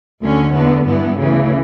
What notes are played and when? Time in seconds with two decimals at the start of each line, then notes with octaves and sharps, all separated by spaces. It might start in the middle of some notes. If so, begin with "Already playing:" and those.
0.22 D2 D3 C#4
0.54 E2 D3 B3
0.85 G2 E3 B3
1.17 D2 C#3 E3